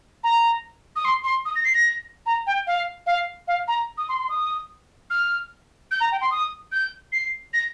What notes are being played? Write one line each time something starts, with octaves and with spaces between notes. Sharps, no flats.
A#5
D#6
C6
C6
D#6
A#6
C7
A#6
A#5
G5
F5
F5
F5
A#5
D#6
C6
C6
D#6
F6
G6
A#5
G5
C6
D#6
G6
C7
A#6